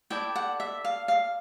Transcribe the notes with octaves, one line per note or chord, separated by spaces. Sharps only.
E4 A4 D5 G5
F#5
E5
F5
F5